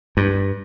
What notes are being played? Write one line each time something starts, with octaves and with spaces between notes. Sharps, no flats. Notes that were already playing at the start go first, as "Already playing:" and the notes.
G2